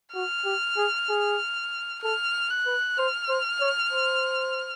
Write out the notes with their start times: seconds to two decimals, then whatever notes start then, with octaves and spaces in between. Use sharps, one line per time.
0.13 F#4 F6
0.45 G4
0.77 G#4
1.09 G#4
2.03 A4 F6
2.50 F#6
2.66 B4
2.98 C5 F6
3.29 C5
3.60 C#5
3.92 C5